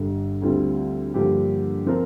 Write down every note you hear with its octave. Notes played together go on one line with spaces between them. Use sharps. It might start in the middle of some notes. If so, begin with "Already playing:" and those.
Already playing: G1 G2 D3
D2 D3 G3 C4 F4
G2 D3 F3 A#3 G4
F3 C4 F4 A#4